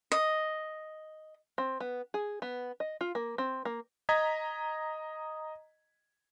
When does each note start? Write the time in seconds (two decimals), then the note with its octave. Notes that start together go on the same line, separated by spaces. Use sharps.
0.12 D#5
1.58 C4
1.80 B3
2.14 G#4
2.42 B3
2.80 D#5
3.01 F4
3.15 A#3
3.38 C4
3.65 A#3
4.09 D#5 A#5 G#6 B6